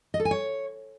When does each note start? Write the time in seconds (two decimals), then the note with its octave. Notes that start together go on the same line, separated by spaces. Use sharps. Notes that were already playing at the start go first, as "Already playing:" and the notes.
0.14 D#5
0.20 A4
0.25 G#5
0.31 C#5